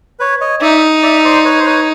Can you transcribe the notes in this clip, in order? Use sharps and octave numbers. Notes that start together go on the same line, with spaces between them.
B4 C#5
C#5 D#5
D#4 D5 E5
D5 E5
C5 D5
B4 C#5
C5
B4 C#5